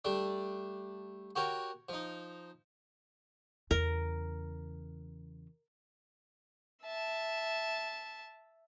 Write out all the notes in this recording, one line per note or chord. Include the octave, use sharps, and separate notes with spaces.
G3 A3 D4
F#4 G4 A#4 C#5
F3 D#4
E2 C#3 A#4
E5 A5